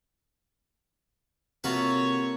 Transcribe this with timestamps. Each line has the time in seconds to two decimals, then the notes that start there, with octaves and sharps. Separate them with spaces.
1.64 C3 A#3 F4 F#4 A4 B4 C#5